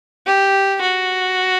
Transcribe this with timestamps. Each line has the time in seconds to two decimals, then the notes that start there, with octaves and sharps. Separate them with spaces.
0.26 G4
0.81 F#4